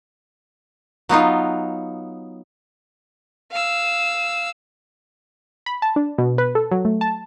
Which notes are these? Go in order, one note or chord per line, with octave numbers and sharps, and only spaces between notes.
F#3 B3 D#4 F4
F5 E6
B5
A5
D4
B2
B4
A4
F#3
A3
A5